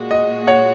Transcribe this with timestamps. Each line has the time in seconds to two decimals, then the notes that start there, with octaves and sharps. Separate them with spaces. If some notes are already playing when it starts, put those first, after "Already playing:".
Already playing: A#2 G#3 F#4
0.11 D#5
0.47 C#5 F#5